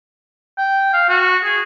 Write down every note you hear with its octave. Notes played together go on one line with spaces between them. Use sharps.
G5
F5
F#4
G#4